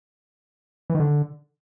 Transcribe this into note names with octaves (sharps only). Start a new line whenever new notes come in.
E3
D#3
D3